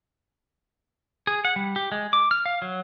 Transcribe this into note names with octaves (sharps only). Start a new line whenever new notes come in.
G#4
F#5
G3
G4
G#3
D6
F6
F5
F#3